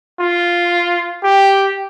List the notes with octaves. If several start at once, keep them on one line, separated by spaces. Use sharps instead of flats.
F4
G4